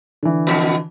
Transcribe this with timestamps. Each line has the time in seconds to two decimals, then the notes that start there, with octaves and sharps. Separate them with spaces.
0.23 D3 E3
0.47 F2 B2